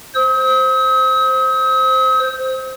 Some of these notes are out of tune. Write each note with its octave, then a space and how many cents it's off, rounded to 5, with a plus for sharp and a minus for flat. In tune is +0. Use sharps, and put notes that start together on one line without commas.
C5 +0 D#6 +45